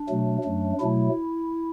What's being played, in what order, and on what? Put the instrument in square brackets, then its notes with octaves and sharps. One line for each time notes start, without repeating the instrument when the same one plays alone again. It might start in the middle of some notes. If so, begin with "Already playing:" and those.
Already playing: [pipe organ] D4
B2 F#3 A3
F#2 F#3 A3
B2 F#3 A3 E4